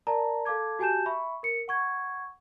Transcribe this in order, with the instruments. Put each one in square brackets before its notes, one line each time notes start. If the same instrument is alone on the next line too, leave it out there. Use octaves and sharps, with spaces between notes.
[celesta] A#4 D5 A5 A#5
A4 F5 A5 D6 G#6
F#4 G4 G#5 A5 G6 E7
E5 B5 C#6
A#4 C#7
F#5 C#6 G#6